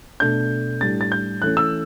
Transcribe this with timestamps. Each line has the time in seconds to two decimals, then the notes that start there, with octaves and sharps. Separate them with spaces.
0.20 B2 A3 D4 G6
0.81 A2 G3 D4 A6
1.01 A6
1.12 G6
1.42 E3 A3 C#4 F#6
1.57 E6